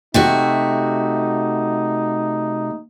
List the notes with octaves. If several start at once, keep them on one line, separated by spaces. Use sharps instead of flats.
C3 A3 D#4 F#4